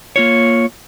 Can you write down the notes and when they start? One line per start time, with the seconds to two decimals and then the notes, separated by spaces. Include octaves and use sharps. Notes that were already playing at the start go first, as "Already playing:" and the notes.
0.16 A#3 F4 C#5